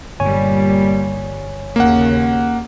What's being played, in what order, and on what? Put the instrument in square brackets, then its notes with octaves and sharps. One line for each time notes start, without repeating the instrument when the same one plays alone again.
[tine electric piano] G1 C#5 G#5 [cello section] A#2 G3
[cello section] D#2 C#3 [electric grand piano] A#3 F#5